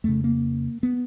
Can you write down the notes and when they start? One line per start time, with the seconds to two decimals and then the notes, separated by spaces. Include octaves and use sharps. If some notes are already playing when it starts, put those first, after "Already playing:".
0.04 F2 C#3 A3
0.24 A#3
0.83 B3